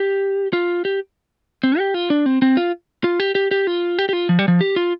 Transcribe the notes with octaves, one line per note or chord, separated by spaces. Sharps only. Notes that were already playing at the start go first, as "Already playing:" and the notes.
Already playing: G4
F4
G4
C4
G4
F4
D4
C4
C4
F4
F4
G4
G4
G4
F4
G4
G4
F4
F3
G3
F3
G4
F4